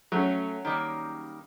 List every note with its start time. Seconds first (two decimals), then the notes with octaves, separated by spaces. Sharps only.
0.12 F#3 A3 C#4
0.65 D#3 G3 A#3